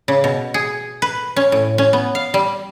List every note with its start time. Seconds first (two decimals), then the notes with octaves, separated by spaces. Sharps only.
0.08 C#3
0.24 B2
0.54 G#4
1.02 B4
1.36 C#4
1.52 A2
1.78 C#4
1.93 B3
2.15 F5
2.34 G3